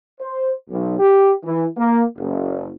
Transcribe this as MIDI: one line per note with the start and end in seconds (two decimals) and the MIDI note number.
0.20 0.51 72
0.69 0.95 35
0.99 1.31 67
1.44 1.65 52
1.76 2.02 58
2.17 2.71 30